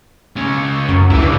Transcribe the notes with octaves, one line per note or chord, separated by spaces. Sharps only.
C#2 C#4
F#2
C#2 E4 B4
G2 C#3 D4